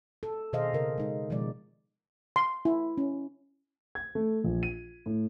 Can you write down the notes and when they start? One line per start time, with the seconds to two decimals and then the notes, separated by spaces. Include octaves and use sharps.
0.23 A4
0.53 B2 D#3 G#4 C5 D#5 F5
0.73 C#3 A#4
0.98 G#3 D#4
1.30 B2 D#3 F3 G#3 D5
2.36 C6
2.65 E4
2.98 C#4
3.95 G#6
4.15 A3
4.44 A#1
4.63 D#7
5.06 A2